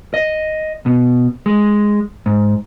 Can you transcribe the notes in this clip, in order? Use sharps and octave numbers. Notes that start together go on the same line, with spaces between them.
D#5
B2
G#3
G#2